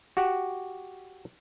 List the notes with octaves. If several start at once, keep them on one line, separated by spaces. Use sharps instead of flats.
F#4 G4 F#5